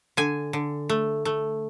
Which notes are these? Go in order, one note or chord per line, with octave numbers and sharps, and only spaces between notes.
D3 G#5
D3
A3
A3